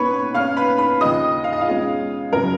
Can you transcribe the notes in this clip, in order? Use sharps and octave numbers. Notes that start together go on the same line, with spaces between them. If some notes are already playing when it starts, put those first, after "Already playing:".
Already playing: B2 A#3 C#4 B4 C#5 B5 C#6
B2 A#3 C#4 F5 F6
B4 B5
B4 B5
D#2 C#3 F3 D#5 D#6
F5
D#5
F4 F5
B2 G#3 C#4
F#2 C#3 F#3 A#4